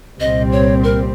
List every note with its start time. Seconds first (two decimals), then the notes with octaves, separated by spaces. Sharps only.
0.20 C2 A#2 G3 C4 D#5
0.52 C#5
0.84 A#4